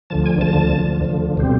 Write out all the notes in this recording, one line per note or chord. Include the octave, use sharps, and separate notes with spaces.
D2 D3 F3 A5
G#5
D2 D3 F3 A5
D2 D3 F3
D2 D3 F3
B2 G3 C4